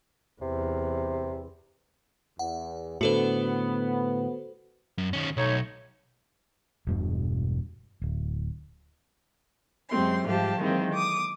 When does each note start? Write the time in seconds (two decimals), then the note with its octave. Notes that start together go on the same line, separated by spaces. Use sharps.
0.41 E2 C3
2.39 E2 F#5
3.01 A2 D3 B3 F#4 A4 C5
4.98 F#2
5.13 D#3 C#4
5.37 B1 A3 D#4 C#5
6.87 E1 G2 B2
8.02 D1
9.91 F#2 C3 F#3 G#3 C4 C6
10.25 G#2 F3 G3 G4 F5 A5
10.59 D#3 E3 F#3 G#3 A#3 C4
10.94 D6 D#6